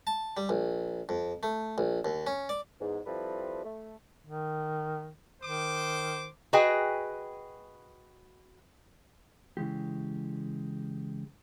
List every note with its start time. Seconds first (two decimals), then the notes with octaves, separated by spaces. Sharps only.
0.07 A5
0.37 G3
0.49 A#1
1.09 F2
1.43 A3
1.78 A#1
2.05 D#2
2.27 C#4
2.49 D5
2.80 E2 G#2
3.06 F3 G3 C4 E4 A4 B4
3.64 A3
4.26 D#3
5.42 D#3 C5 D6
6.53 F#4 G#4 B4 D#5 G5 G#5
9.57 C#3 E3 G#3 G4